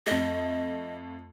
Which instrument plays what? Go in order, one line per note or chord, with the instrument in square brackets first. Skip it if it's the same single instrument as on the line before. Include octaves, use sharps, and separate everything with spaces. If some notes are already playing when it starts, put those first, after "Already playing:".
[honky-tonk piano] F2 A3 [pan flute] D#5